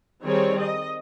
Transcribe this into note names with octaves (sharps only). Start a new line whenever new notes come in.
D#3 G3 C4 G#4 C#5
D#5